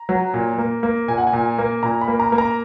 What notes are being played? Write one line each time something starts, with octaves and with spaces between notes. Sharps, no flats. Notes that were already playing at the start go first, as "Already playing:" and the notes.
Already playing: A#5
F#3
A#2
A#3
A#3
A#2 G#5
F#5
G#5
A#2
A#3
A#2 A#5
B5
A#3
A#5
A#3
A#5